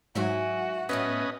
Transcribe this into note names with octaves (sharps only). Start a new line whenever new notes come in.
G#2 E3 F#3 F#4 E5 G#5
A2 A3 B3 C#4 B4 D#5